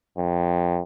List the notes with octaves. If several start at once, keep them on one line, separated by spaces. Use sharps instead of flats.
F2